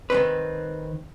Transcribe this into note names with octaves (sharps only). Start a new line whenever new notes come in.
D#3 C4 B4